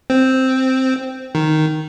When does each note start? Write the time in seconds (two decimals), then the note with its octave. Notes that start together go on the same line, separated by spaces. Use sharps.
0.10 C4
1.35 D#3